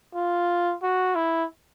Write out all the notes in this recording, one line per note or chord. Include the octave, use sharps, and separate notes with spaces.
F4
F#4
E4